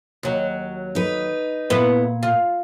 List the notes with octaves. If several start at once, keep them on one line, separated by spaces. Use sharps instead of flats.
D#2 F#3
D#4 B4
A#2 B3 E4 B4
F4